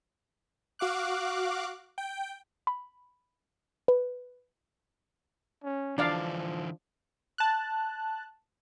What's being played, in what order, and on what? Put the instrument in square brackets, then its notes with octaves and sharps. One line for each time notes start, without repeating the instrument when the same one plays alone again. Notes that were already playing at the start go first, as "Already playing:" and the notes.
[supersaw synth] F#4 F5 D6 F#6
G5
[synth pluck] B5
B4
[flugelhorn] C#4
[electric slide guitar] D3 E3 [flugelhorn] F3 [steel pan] D4 D5 F5
[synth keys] A5 F#6